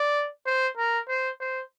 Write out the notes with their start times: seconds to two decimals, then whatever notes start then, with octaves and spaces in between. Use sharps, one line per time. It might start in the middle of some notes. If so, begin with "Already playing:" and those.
Already playing: D5
0.46 C5
0.77 A#4
1.08 C5
1.40 C5